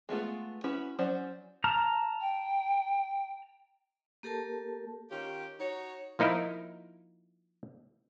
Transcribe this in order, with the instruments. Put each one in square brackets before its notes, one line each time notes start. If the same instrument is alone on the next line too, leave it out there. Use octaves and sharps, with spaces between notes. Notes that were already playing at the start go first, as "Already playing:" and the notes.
[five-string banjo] G#3 A3 B3 F4
C#4 E4 F#4 B4
F#3 C#4 C5 D5
[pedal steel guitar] A5 A#5 F6
[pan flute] G5
[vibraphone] A#3 G4 A4 A#4 A5
[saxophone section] D#3 C#4 F4 G4
D#4 F#4 C#5
[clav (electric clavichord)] F3 A#3 D#4 E4 A#4